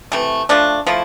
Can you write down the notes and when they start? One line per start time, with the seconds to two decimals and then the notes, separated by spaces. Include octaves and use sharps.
0.12 C3 E3 A3
0.49 F3 A3 D4
0.87 F3 A3 E4